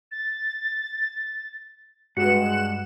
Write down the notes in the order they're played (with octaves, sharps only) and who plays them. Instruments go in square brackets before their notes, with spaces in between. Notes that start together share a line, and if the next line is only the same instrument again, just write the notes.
[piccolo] A6
[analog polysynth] G2 G#3 E7 [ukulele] F#4 B4 [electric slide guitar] F#5 [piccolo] F#6